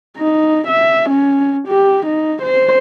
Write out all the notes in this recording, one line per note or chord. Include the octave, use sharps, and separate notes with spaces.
D#4
E5
C#4
G4
D#4
C5